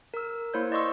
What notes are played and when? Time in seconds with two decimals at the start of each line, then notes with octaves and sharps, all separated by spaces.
0.14 A#4 E6
0.54 A#3 E4 C5 C#5 G6
0.72 D5 D#5 C6 C#6 E6